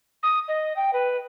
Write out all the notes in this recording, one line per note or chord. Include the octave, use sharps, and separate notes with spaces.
D#6
D#5
G5
B4